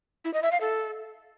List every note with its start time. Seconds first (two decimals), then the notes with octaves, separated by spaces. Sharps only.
0.25 E4
0.34 D#5
0.43 E5
0.52 F5
0.61 A4